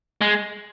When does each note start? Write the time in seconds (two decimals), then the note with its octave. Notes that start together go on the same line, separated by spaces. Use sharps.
0.21 G#3